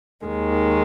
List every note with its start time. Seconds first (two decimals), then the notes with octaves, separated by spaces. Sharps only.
0.25 D#2 D#3 G#3